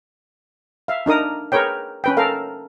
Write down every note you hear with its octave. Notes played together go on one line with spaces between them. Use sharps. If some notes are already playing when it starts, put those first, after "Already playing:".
E5 F5
D4 D#4 A#4 D#6
G#4 A#4 B4 C#5 G5
C#4 B4 G5
A4 A#4 F5